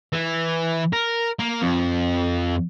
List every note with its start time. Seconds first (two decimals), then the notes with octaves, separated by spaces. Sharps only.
0.13 E3
0.93 A#4
1.39 A#3
1.62 F2